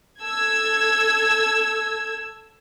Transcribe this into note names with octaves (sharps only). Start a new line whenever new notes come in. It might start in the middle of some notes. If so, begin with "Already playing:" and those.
A4 E6 G#6